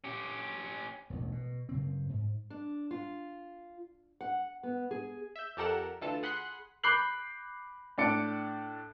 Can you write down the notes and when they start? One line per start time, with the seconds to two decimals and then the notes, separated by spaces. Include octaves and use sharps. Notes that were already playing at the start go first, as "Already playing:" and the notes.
0.04 C#4 G4
1.10 E1 A1 D#2
1.32 B2
1.69 F#2 C#3 C4
2.09 G#2
2.50 D4
2.91 F4
4.21 F#5
4.63 B3
4.91 G#4
5.36 E5 G6
5.57 F2 G4 A4 A#4 F#5 E7
6.01 D2 E3 F4 A4 A5
6.23 G#4 F#5 B5 C6 F#6
6.84 B5 D6 F#6 G6 C7 F#7
7.98 A2 D4 D5 A5 C#7 D7